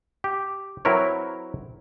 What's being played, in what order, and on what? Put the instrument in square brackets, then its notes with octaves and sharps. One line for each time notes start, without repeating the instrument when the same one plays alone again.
[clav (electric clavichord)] G4
F#3 C4 E4 A#4 B4 C#5